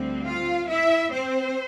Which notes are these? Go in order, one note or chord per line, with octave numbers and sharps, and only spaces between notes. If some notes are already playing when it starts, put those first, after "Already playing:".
Already playing: D2 D3 G3 C4
F4 F5
E4 E5
C4 C5